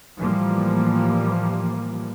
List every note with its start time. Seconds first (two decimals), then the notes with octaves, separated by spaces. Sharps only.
0.18 A2 E3 F3 G3 A#3